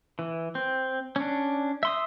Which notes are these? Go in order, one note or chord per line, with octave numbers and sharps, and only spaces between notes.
E3
C4
C#4 D4
E5 C6 D#6